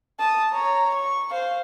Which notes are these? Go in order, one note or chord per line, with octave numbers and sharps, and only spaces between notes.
A5 D#6
C#5 A#5
C#6
C5 F5